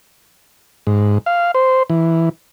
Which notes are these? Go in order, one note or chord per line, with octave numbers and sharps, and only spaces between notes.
G#2
F5
C5
E3